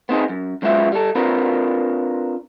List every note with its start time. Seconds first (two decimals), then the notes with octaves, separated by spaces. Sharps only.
0.09 B3 C4 D#4 G#4
0.29 F#2
0.62 F#2 G#3 B3 F4 E5
0.92 G3 A4
1.15 C4 D4 F4 A#4 B4